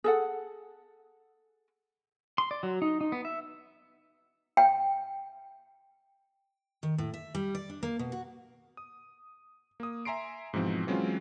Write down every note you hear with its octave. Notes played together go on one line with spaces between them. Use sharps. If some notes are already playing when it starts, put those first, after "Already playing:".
G#4 A4 F#5
C6
D5
F#3
D#4
D#4
B3
E5
G5
D#3
A2
E5
G3
D5
D4
A#3
B2
F#4
D#6
A#3 D#6
E5 G#5 A#5 C6 C7 D7
G#2 B2 E3 F3 C4
E3 F#3 G#3 C4 C#4 F4